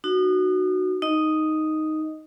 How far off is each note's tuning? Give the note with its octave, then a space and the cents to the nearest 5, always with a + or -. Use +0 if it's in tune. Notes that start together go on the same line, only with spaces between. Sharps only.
D#4 -35 F#4 +0
D#4 +0 D#5 +0